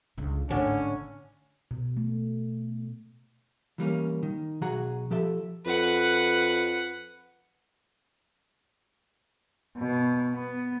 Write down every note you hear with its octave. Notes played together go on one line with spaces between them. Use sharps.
C#2 D3
G#1 A2 D3 C#4
B2
A3
E3 G3 A#3 C#4
D#3
B1 F#3 F#4 G#4 F#5 A#5
F3 G4 A4 E5
F2 B4 F#5
B2
B3